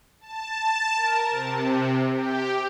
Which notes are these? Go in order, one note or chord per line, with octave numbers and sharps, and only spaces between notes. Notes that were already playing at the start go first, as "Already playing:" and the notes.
A5
A#4
C3
G4